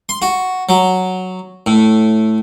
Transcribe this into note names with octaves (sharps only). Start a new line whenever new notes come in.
C6
F#4
F#3
A2